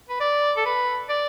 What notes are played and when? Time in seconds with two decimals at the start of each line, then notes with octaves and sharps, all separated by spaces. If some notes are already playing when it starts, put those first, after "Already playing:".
0.09 B4
0.20 D5
0.57 A4
0.66 B4
1.09 D5